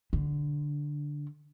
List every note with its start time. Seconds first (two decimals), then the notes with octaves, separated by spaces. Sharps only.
0.13 D3